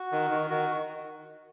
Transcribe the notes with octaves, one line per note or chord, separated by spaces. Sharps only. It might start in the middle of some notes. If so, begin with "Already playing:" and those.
Already playing: F#4
D#3
D#3
D#3 F#4